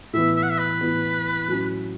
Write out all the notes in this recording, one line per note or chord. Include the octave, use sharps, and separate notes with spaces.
A2 E3 B3 E5
E5
F#5
E5
B4
A2 E3 B3
A2 F#3 C#4